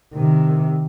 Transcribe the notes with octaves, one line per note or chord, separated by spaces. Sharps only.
C3 D#3